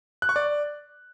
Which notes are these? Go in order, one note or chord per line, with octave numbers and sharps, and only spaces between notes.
F#6
C#6
D5